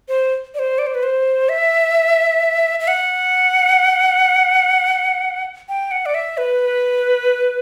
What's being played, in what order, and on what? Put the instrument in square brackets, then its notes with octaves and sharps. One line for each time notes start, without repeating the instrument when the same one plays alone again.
[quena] C5
D5
C5
D5
C5
B4
C5
E5
E5
F#5
G5
F#5
D5
E5
B4